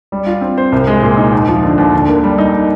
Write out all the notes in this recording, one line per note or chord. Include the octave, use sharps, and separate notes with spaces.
G3
F4
C4
C5
C2
G#3
A#2
D#4
D#2
F3
D3
D#2
D3
A#3
G3
D#4